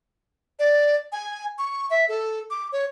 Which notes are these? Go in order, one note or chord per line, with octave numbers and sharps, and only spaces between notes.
D5
G#5
C#6
E5
A4
D6
C#5